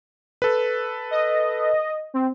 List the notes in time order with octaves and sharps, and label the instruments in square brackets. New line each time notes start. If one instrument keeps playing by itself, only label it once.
[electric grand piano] A4 B4
[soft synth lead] D#5
C4